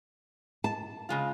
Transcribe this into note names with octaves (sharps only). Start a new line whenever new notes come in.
A5
C#3 G#3 F4